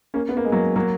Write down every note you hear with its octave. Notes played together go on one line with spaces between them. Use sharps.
A#3 C#4
B3
A#3
G#3
F#3 A#3
F#3 A#3